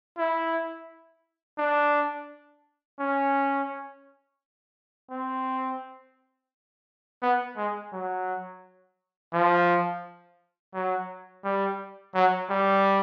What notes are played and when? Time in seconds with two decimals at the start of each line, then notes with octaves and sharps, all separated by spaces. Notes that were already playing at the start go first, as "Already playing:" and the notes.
0.18 E4
1.58 D4
2.99 C#4
5.10 C4
7.22 B3
7.57 G#3
7.92 F#3
9.33 F3
10.74 F#3
11.44 G3
12.15 F#3
12.50 G3